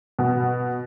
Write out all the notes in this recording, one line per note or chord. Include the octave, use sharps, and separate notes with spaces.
B2